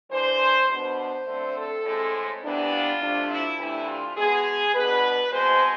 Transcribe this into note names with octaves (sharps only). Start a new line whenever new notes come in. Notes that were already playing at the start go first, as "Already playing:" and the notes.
E3 G#3 D4 C5
B2 B3 D4 C5
D3 A3 C4
A4
A2 G#3 C4
C3 E3 B3 D4
F4
C3 F3 A3 D4
E4
C3 E3 A3 D4 E4
F4
B2 G#3 B3 G#4
B2 B3 D4 B4
B2 G#3 C4 C5